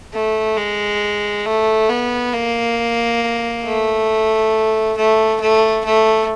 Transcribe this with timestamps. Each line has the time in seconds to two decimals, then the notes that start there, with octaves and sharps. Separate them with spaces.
0.13 A3
0.57 G#3
1.46 A3
1.89 B3
2.33 A#3
3.65 A3
4.97 A3
5.41 A3
5.84 A3